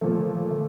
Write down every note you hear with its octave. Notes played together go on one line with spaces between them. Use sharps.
A#2 E3 F3 A3
D3
E3
D3 A3